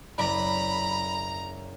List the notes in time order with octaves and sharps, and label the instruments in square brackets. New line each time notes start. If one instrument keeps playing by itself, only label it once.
[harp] F#1 D5 [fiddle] A#5 [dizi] B5